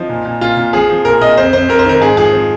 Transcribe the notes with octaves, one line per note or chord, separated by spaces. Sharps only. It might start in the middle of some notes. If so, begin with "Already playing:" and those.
Already playing: F3 D#4
A#2
A#2
A#2 F4
A#2
F3 G#4
F3
A#2 A#4
A#2 D#5
F2 C5
F2 C5
F2 A#4
C5
D#3 A#4
G#2 G#4
F3 G#4
F3